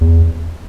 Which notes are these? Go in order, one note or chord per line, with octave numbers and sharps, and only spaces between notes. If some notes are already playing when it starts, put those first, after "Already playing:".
E2